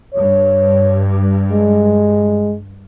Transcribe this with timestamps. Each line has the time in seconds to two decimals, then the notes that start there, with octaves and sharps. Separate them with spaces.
0.14 G2 C#5
1.52 G#3